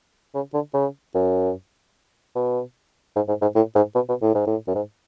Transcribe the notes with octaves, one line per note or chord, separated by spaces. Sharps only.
C#3
D3
C#3
F#2
B2
G#2
G#2
G#2
A2
G#2
B2
B2
A2
G#2
A2
F#2
G#2